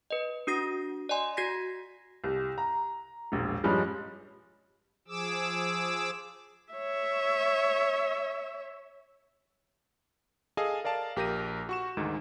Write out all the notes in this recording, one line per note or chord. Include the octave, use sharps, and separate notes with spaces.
B4 D#5
D4 F#4 D#6 A#6
D5 D#5 G#5 C6
F#4 G#6 A#6 B6
C2
A#5
E1 A#1
G2 F3 G3 G#3 C#4
F3 G#4 D6 E6
C#5 E5
G#4 A4 D#5 F5 G#5 A5
A#4 D5 F5 A5
A#1 G4 A#4 G6 A#6 D#7
F#4 C#6 E7
D2 G#2 D#3